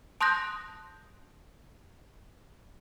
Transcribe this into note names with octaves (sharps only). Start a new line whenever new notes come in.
A5 C6 D#6 F#6 G6 A#6